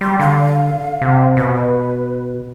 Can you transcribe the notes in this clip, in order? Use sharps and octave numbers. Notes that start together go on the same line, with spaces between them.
G3 C6
D3 F5
C3
B2 B4